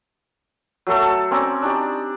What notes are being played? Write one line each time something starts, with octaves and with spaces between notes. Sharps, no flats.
F#3 A3 A4
C4 C#4 D5 A#5
D4 D#4 G4 D5